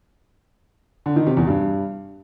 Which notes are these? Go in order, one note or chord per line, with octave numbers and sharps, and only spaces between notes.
D3
D#3
C3
E2
G2